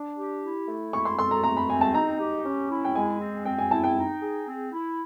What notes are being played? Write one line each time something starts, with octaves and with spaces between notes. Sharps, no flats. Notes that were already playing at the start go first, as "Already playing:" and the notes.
Already playing: D4
G4
E4
A3
E4 C#6
C6
A4 C6
A#5
A3 A#5
B5
C4 G#5
A5
D#4 A#5
G4
C#4
E4
G5
G#3 G#5
C4
C4 G5
G#5
E4 A5
G5
D#4
G#4
C4
E4